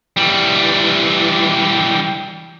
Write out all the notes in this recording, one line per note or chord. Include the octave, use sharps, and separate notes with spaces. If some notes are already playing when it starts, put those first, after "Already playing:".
E3 G3